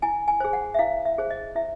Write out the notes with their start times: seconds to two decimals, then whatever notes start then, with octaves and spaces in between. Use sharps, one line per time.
0.02 E4 G#5
0.28 G#5
0.40 G#4 C5
0.53 F#5
0.74 E5
0.79 E4 F5
1.05 E5
1.18 G#4 C5
1.31 D#5
1.55 E4 E5